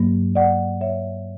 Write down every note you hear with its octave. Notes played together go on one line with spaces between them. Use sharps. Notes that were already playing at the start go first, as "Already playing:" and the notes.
Already playing: G2 F#3 A#3
D5 F#5
C#5 E5